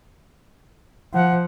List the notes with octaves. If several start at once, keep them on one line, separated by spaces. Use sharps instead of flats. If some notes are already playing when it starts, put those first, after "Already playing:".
F3 F#5